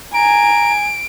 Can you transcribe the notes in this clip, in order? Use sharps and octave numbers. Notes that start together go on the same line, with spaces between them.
G#5 A#5 D7